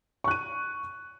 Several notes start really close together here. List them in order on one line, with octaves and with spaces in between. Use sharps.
C#6 F#6 D#7